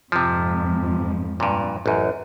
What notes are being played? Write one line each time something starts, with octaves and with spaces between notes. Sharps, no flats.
F2 G#2 C3 F3
G2 A#2
A1 F#2